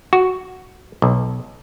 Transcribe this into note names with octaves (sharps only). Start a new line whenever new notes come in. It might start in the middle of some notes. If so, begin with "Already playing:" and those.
F#4
B1